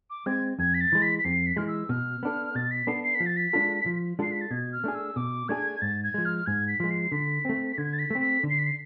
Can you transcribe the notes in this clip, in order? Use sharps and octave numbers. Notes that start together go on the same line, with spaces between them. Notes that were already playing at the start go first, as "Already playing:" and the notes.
D6
G#3 C4 G#6
F2 G#6
B6
A6
E3 G#3
B6
B6
F2 C7
B6
E3 G#3 F6
E6
B2 F6
B3 D4 A4
B2 A6
B6
B3 D4 A4 C7
C7
B6
F3
A6
B6
G#3 D4 F4 A4
F3
G#3 D4 F4 A4 C7
B6
A6
B2 G#6
F6
A3 D4 G#4
E6
B2 D6
A3 D4 G#4 G#6
G#2 A6
G#6
F3 G#3
F6
G#2 G#6
B6
F3 G#3
C7
D3 B6
A3 C4
D3 G#6
A6
B6
A3 C4
B6
D3
C7
B6
C7